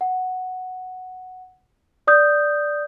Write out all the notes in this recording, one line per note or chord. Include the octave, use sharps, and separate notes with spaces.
F#5
D5 D#6 G6